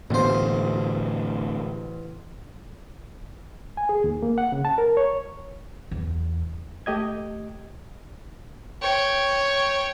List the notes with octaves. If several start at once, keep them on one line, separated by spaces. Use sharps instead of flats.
A1 A2 D3 B3 C5
G#5
G#4
D#2
A#3
F#5
C#3
A5
A#4
C#5
E2
A3 G4 D#5 G#6
C#5 G5